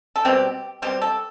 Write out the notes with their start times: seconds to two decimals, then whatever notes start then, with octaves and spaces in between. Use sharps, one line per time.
0.16 A4
0.25 B2 G3 C4 G4
0.82 B2 G3 C4 G4
1.02 A4